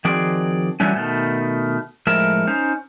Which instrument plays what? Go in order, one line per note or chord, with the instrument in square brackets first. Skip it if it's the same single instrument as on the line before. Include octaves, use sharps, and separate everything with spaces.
[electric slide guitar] D#3 F3 C4 F#4 G#4 D5
D3 E3 F#3 G3 A3 C#4
B2 D#3 A3
A2 F3 G#3 A#4 E5
C#4 D#4 C5